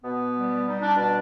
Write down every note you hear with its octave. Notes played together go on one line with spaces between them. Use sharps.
B2 B3
G3
G3 D#4
D4
B2 D4